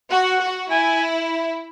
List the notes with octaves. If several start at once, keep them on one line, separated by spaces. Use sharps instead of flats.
F#4 F#5
F#4
E4 G#5